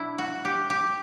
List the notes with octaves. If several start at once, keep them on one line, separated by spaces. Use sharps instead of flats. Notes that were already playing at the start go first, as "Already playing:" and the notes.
Already playing: B2 F#3 D4 E4
F#4
G4
G4